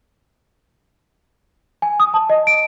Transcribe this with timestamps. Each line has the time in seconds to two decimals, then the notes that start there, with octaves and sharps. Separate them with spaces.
1.82 G#5
2.00 D#6
2.14 A5
2.30 D#5
2.47 D7